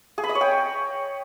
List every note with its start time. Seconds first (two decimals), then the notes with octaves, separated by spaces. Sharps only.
0.18 G#4
0.24 B5
0.29 D#5
0.35 C#5
0.41 G5